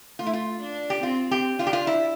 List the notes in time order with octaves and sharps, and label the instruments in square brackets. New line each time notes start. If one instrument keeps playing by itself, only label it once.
[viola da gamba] A3 [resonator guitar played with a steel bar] F4
[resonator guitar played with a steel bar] E4
F4
[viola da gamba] D4
[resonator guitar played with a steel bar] G4
[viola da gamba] C4 [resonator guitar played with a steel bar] F4
[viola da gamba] C4 [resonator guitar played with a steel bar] G4
[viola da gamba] D4 [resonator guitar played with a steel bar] F4
[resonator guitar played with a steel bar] G4
F4
E4